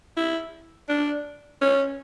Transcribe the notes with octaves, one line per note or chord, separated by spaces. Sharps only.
E4
D4
C#4